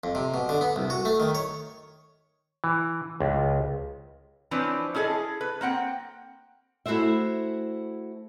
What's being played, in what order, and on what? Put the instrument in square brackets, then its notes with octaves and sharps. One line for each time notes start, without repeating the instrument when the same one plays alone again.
[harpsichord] F2
C3
B2
D3
B3
C2
F#4
A3
D#3
C#5
[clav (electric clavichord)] E3
C#2
[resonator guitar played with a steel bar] E3 F3 C4 D4 B4 C#5
C#4 E4 G#4 A4 D#5
B4
A#3 C4 F#5 G5
[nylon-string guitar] A3 E4 F#4 G#4 C5 E5